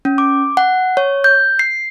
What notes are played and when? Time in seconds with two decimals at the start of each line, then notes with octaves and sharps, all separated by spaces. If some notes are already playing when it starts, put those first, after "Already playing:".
0.05 C#4
0.18 D6
0.57 F#5
0.97 C#5
1.24 G6
1.59 C7